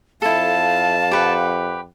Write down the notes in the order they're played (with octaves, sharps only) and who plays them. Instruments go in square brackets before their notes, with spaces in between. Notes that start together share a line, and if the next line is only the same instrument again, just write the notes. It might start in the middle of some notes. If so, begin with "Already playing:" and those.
[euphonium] F2 [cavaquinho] E4 A4 [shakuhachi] F5 [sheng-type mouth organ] A5
[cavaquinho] G4 B4 F#5